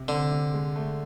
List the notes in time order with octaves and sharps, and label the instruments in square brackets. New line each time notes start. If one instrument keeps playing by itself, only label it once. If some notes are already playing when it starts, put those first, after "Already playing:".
Already playing: [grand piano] C3
[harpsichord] D3 [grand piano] C4
[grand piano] C3
G#3
A3